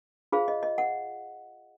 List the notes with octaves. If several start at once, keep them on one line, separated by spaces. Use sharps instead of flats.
F4 G#4 C5 F5
D#5
D#5
F#5